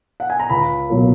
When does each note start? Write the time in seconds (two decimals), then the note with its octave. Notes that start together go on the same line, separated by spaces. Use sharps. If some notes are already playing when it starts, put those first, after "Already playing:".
0.20 F#5
0.30 G#5
0.39 A#5
0.50 C#2 B5
0.90 B2 F#3 A#3